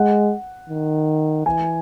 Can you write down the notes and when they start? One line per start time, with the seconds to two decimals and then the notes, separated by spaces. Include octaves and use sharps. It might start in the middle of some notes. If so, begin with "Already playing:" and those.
Already playing: G#3 F#5
0.69 D#3
1.46 E3 G#5